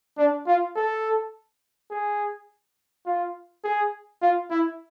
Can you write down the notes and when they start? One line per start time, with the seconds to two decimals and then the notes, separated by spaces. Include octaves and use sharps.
0.18 D4
0.47 F4
0.76 A4
1.90 G#4
3.06 F4
3.64 G#4
4.22 F4
4.51 E4